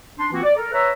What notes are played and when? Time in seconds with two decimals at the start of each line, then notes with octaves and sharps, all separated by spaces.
0.18 D4 C6
0.32 E3 A#3 C4 F4 F#4
0.44 D5
0.56 A4 A#4
0.72 B4 C#5 E5 A#5